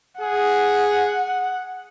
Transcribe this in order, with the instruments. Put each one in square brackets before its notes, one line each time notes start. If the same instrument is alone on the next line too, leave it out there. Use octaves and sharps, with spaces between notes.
[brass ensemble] G#4 [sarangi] F#5